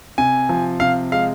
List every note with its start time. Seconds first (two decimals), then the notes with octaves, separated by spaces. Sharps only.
0.18 C3 G#5
0.49 F3
0.80 C3 F5
1.12 G#3 F5